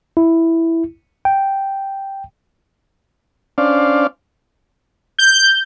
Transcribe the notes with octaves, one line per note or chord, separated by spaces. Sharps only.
E4
G5
C#4 D4 C5 D5 F5
G6